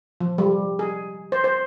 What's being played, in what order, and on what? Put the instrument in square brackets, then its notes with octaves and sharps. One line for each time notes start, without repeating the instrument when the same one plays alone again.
[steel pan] F3
G3
G#4
C5
C5